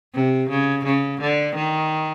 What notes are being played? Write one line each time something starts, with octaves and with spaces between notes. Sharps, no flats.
C3
C#3
C#3
D3
D#3